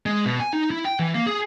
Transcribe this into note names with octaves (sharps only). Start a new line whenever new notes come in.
G#3
B2
G#5
D#4
E4
G5
E3
A#3
G#4